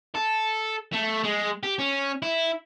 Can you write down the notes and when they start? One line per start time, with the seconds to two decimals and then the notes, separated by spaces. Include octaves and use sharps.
0.15 A4
0.93 A3
1.24 G#3
1.63 G4
1.79 C#4
2.22 E4